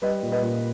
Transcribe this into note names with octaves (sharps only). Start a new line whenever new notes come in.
G3 B4 D#5
A#2
B4 D#5
A#2